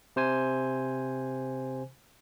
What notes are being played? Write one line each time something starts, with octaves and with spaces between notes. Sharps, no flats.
C3 C5 G#5